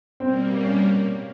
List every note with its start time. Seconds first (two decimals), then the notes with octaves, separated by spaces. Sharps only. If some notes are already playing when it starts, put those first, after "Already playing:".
0.20 B2 G3 A#3 C4
0.64 C#4